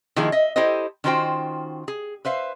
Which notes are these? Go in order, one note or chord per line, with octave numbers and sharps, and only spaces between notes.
D#3 F3 A#3 E4 G#4
D#5 E5
E4 G4 A4 C5 D#5
D#3 C#4 F4 F#4 C5 G5
G#4
B4 C5 E5 F5